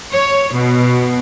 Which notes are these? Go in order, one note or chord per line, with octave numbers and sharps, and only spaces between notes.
C#5
B2